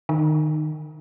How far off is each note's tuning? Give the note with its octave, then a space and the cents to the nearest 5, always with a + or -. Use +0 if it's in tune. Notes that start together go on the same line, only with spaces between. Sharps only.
D#3 -20